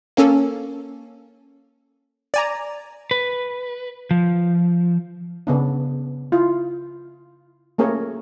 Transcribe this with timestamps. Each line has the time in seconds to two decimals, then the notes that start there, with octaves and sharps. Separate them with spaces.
0.17 A#3 C#4 A4
2.34 D5 G#5 A#5
3.11 B4
4.11 F3
5.47 C#3 B3 D4
6.32 E4 F4
7.78 A3 A#3 C#4 G#4 A#4 C#5